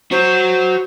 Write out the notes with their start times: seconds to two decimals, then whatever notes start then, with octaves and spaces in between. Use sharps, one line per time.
0.11 F#4 C5 C#5